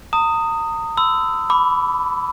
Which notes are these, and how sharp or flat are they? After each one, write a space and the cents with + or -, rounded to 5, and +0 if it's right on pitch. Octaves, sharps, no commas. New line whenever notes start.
A#5 -40 D#6 +0
B5 +45 E6 +0
B5 +15 D6 -15